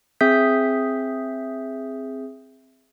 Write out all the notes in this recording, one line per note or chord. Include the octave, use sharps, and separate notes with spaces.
C4 G#4 E5 D#6 G6 B6